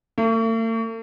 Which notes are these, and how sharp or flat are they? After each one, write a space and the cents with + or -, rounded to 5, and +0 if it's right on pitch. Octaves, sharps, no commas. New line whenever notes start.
A3 +45